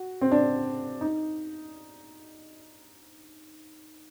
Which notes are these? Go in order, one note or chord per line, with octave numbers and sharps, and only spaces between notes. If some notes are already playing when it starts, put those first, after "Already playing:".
Already playing: F#4
C4
D4
D#4